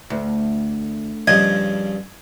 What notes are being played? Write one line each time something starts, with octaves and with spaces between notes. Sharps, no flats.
D2
G2 C#3 F3 D#5 G#6